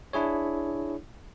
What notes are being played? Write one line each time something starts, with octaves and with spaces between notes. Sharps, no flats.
D4 E4 G#4 C#5